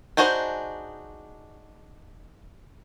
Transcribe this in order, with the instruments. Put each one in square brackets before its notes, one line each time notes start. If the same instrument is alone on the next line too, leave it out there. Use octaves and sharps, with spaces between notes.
[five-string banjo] D4 D#4 F#4 G#4 C5